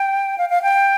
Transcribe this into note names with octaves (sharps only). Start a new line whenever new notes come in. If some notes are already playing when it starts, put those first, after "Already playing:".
Already playing: G5
F5
F5
G5